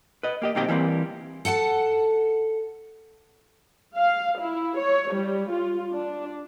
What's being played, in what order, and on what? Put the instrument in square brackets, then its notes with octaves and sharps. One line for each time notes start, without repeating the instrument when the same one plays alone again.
[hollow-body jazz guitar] B4 D#5
A#3 G4 D#5
B1 D#3 A#3 C4 G4 D#5
E3 G3 A#3 C4
[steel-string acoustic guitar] A4 F#5 G5 A5
[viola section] F5
E4
C#5
G3
F4
D4